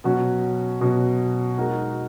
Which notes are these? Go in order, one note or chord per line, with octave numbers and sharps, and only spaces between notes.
B2 F#3 C#4 F#4
B2 F#3 C#4 F#4
G#3 D#4 F#4 A#4